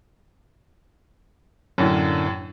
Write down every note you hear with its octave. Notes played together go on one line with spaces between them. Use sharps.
F#2 A2 D3 A#3 C#4